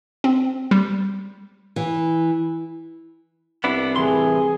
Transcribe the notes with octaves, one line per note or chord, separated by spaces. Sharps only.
C4
G3
E3
C2 B3 D4 E4
A2 E3 G#4 C6